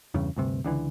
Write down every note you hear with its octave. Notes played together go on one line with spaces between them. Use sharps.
E2 G2 C#3
D2 G2 C3
C#2 D3 E3